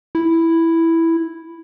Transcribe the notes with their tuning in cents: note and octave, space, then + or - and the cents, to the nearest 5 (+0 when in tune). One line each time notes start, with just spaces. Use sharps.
E4 +0